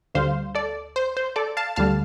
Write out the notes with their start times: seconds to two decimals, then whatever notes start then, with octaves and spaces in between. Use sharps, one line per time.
0.15 D2 D3 G3 C5 F5
0.55 A4 D5
0.96 C5
1.17 C5
1.36 A4 D5
1.57 F5 A5
1.76 D2 D3 G3 F5 A5